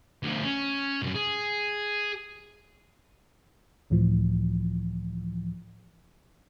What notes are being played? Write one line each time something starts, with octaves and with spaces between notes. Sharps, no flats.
D2 F3
C#4
C#2 F#2
G#4
C#2 A2 E3 F3